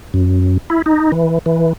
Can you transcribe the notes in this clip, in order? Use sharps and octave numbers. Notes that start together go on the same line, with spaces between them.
F#2
E4
D#4
E3
E3